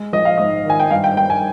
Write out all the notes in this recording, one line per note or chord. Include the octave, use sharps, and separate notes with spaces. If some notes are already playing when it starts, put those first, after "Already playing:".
Already playing: G#3
A#1 D#5
F5
G#2 D#5
D#3 G#5
G5
G2 F5
G5
G2 G5
G#5